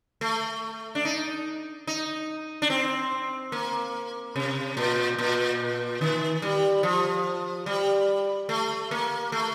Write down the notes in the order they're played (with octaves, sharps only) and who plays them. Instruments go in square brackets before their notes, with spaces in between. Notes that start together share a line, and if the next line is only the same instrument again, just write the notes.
[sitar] A3
D4
D#4
D#4
D4
C4
A#3
C3
A#2
A#2
D#3
G3
F3
G3
A3
A#3
A3